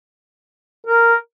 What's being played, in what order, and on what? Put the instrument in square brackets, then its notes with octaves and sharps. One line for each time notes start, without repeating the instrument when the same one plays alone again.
[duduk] A#4